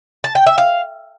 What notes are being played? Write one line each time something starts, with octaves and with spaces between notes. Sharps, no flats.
A5
G5
E5
F5